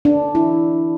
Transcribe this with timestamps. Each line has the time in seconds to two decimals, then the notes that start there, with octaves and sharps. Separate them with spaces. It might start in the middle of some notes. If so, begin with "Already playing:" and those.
0.05 D4
0.35 E4